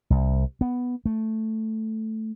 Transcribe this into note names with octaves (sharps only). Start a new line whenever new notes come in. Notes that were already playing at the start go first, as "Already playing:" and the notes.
C2
B3
A3